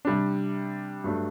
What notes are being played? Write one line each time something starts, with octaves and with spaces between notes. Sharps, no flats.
C3 G3 D4
G2 F#3 A3 D4